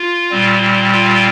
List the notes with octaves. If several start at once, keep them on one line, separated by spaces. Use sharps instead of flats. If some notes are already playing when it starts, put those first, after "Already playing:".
Already playing: F4
A#2 G3 C4
F4